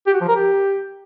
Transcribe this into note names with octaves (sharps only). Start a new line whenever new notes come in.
G4
F#4
F3
A#4
G4